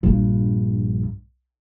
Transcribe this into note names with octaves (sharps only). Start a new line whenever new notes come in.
A#1 G2